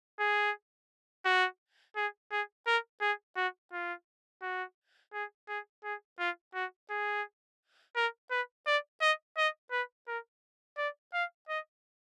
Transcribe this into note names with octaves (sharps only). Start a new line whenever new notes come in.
G#4
F#4
G#4
G#4
A#4
G#4
F#4
F4
F#4
G#4
G#4
G#4
F4
F#4
G#4
A#4
B4
D5
D#5
D#5
B4
A#4
D5
F5
D#5